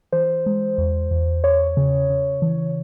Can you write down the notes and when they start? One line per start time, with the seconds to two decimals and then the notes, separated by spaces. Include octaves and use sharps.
0.12 E3 C5
0.46 G#3
0.78 E2
1.11 E2
1.44 E2 C#5
1.77 C#3
2.10 C#3
2.42 E3